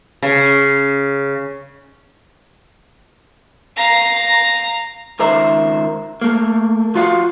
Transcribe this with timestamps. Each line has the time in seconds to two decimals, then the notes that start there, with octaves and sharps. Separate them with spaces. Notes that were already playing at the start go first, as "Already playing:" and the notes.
0.23 C#3
3.77 F5 A#5
5.19 C#2 D#3 A#4 C5 E5 A#5
6.21 A3 A#3
6.95 F3 F4 F#4 F5 F#5